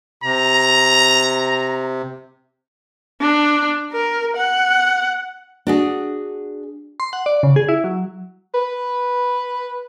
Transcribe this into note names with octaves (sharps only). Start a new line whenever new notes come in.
C3 A#5
D4
A#4
F#5
D4 F#4 G#4
C6
F#5
D5
C#3
G#4
E4
F#3
B4